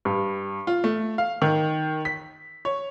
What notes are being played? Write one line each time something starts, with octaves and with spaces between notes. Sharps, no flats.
G2
F4
A3
F5
D#3
B6
C#5